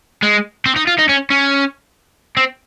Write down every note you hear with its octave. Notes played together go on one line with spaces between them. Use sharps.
G#3
C4
D#4
F4
D#4
C#4
C#4
C4